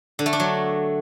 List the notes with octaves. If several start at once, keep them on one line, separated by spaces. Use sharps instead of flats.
D3
A3
D4
F#3